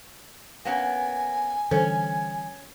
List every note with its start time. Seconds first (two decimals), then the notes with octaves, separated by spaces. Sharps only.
0.65 A#3 B3 C#4 G#5
1.71 D3 E3 G3 C#4 A4 C5